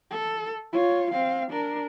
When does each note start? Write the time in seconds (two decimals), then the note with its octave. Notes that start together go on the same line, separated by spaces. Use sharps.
0.11 A4
0.72 F4 C#5
1.12 C4 F5
1.51 D4 A#4